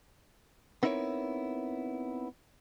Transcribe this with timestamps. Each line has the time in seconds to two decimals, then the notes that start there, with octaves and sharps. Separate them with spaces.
0.83 B3 C4 D#4 E4 A#4 C#5